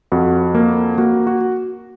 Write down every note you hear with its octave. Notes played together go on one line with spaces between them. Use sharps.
F2 F#4
A#3
A#3 F#4
F#4